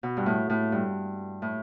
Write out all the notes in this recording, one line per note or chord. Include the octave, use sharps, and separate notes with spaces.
B2
G2
A2
A2
G2
A2